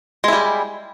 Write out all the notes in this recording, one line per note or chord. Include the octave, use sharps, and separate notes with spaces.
G3 G#3 E4